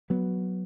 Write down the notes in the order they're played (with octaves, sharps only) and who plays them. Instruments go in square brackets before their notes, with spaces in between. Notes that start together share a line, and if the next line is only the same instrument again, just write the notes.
[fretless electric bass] F#3 B3